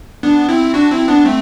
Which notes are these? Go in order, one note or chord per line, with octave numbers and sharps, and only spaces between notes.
B3 D4
C4 E4
D4 F#4
C4 E4
B3 D4
A3 C4